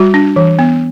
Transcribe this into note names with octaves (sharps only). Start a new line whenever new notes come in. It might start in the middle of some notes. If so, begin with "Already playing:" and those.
Already playing: G3 F#4
D4
E3
B3